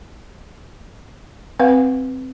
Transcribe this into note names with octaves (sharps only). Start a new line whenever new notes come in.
C4 B4 F5 F#5